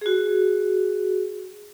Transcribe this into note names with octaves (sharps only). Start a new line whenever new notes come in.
F#4 G#4